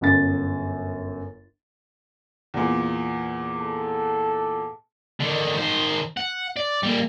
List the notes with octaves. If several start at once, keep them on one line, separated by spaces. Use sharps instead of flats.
G1 F#2 A6
E2 A#2
A4
D3 D#3
D#3 C5
F#5
D5
G3 A#3